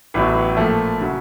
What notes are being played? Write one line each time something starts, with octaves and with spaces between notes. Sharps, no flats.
A1 A2 F#3 B3
A#2 F3 A3
C#3 F#3